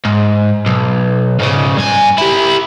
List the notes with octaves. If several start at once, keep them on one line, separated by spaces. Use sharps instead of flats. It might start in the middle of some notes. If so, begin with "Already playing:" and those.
G#2
B1
G#2 C#3
G2 G#5
E4 G4